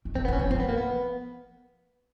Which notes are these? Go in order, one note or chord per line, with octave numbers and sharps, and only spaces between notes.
D#3
E3 C4
B3
D3
C#4
E3 C4
F3 C4
B3
A#3
B3